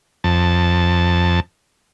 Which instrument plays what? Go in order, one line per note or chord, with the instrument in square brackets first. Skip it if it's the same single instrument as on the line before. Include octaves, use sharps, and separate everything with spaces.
[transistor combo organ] F2 A5